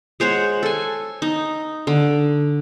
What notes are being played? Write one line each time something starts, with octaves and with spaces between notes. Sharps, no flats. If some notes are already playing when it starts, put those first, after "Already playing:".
G#3 C5 C#5 F#5
A4 G#5
D#4
D3